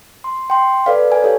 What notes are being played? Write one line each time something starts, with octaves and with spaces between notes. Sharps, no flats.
C6
G5 C6
A4 B4 D5 F5
A#4 G#5
G4 A4 C#5